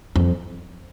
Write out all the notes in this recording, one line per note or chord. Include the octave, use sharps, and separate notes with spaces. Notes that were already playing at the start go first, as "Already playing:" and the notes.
F2